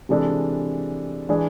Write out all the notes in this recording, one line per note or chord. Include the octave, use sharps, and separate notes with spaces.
C3 E3 G#3 D4 A4
E3 G#3 D4 G#4